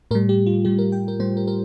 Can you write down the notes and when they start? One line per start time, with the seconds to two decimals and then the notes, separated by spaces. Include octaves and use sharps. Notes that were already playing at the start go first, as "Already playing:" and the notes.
0.11 A2 A#4
0.15 G3
0.29 G4
0.46 F4
0.65 A2 G3 G4
0.79 A#4
0.92 G5
1.08 A#4
1.20 A2 G3 C5
1.37 A#4
1.47 A#4